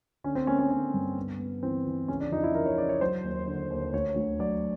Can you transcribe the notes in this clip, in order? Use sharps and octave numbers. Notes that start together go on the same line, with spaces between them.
D3 C#4
C4
A#3 C#4
C#4
D3 C#4
G2
B3
B3
E3 C4
E3
C#3 C#4
D4
F2 D#4
E4
F2 A#4
C#5
C#3 D5
C#5
F#3 C5
D#2
D3
D#2
D2 C#5
D2
F#3 D5